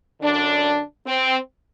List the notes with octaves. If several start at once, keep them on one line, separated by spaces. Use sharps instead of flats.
F#2 D3 D4
C4